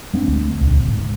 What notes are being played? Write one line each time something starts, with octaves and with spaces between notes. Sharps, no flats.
G#3 C4 D4
D2
D#1 C#2
G#2